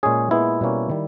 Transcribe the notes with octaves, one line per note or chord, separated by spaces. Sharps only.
A#2 G#3 C#4 G#4
A#2 G#3 B3 E4
B2 G3 A#3 C#4
D#3 G3